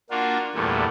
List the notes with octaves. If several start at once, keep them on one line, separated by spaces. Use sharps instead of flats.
A#3 D4 F4 F#4
E2 G2 A#2 A3